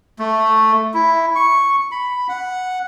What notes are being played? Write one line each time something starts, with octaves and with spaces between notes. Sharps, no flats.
A3
E4
C#6
B5
F#5